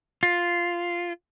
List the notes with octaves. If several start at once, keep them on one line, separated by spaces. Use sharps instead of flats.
F4